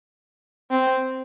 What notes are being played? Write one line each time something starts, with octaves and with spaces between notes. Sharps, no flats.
C4